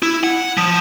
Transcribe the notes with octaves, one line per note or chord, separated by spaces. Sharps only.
E4
F#5
F3